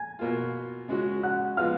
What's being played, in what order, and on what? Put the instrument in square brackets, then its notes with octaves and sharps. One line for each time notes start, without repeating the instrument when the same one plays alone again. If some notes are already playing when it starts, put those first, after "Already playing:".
Already playing: [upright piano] G#5 G#6
[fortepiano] B2 A#3 F4
C#3 G#3 C#4 F#4
[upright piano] F#5 F#6
[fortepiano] F3 G#3 B3 [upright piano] F5 F6